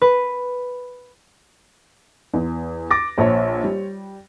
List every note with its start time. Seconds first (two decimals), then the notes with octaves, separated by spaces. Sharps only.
0.02 B4
2.33 E2
2.91 D6 A6 A#6
3.18 A#1 C5 C#5 A5
3.64 G3